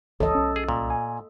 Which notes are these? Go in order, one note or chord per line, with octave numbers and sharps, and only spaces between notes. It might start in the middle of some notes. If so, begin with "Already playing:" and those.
G#1 C#2 E3 A4 C#5 D#5 A5
B1 C#4
G#4
C2 A#2
G#5